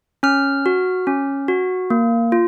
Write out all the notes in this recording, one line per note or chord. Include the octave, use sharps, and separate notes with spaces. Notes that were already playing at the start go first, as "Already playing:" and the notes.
C#4 F6
F#4
C#4
F#4
A#3
F4